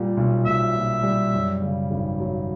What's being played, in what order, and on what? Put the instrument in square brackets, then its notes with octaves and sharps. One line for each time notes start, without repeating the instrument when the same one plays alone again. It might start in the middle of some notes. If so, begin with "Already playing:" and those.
Already playing: [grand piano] A#2 G3
B1
[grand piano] B1 [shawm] E5
[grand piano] A#2
G3
F#2
C#3
G#1
F#3